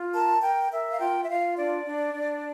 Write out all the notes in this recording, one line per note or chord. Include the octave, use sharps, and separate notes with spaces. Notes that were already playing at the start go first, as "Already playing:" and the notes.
Already playing: F4
A#4 A5
A#4 G5
A#4 E5
F5
F4 G5
E5
F4 F5
D4 D5
D4
D4